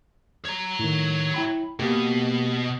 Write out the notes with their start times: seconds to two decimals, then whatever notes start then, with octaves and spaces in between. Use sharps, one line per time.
0.45 C#5 A#5
0.79 A2 D#3
1.34 E4 G5 B5
1.79 B2 A#3 G4